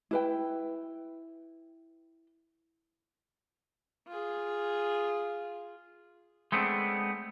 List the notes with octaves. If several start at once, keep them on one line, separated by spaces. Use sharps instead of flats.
E4 B4 G5
F4 G#4
G#3 A3 B3 C4 D4